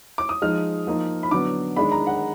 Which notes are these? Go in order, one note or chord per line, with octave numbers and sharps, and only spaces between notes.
D6
D#6
F3 G#3 D#4 F6
F3 A#3 D#4
B5
D3 F#3 B3 D6
D#3 G#3 D4 B5
A#5
F#5